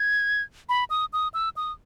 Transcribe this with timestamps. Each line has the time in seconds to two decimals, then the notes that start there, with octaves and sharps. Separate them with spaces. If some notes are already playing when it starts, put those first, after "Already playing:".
Already playing: G#6
0.69 B5
0.90 D#6
1.13 D#6
1.34 E6
1.57 D#6